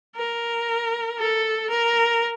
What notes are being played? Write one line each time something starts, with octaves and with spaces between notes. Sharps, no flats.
A#4
A4
A#4